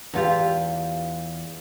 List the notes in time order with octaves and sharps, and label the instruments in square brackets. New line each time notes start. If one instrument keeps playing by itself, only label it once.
[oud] E2 F4 G4